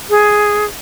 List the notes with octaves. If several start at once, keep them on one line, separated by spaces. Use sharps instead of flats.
G#4